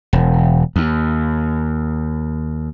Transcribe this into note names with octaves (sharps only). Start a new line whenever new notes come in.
E1
D#2